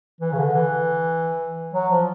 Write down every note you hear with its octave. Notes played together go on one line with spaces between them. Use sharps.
E3
C#3
D3
E3
F#3
F3